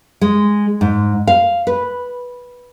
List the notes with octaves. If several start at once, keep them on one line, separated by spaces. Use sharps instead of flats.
G#3
G#2
F5
B4